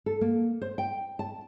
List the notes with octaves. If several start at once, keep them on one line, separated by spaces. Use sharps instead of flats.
A4
A#3
C5
G5
A5